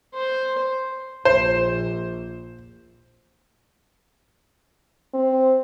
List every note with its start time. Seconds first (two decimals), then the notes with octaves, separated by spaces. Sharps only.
0.14 C5
1.25 A#1 C5
5.14 C4